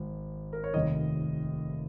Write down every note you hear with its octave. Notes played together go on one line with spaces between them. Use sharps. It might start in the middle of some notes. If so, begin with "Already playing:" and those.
Already playing: G#1
A#4
C#5
F1 D#2 D#3 D#5